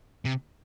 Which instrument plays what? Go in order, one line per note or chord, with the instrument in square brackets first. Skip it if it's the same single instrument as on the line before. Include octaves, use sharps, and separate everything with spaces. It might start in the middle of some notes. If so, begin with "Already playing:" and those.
[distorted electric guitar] C3